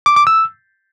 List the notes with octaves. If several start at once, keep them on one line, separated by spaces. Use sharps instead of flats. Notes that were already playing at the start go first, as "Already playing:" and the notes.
D6
D6
E6